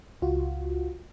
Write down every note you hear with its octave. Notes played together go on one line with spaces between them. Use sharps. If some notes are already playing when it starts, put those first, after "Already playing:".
C#2 F4 F#4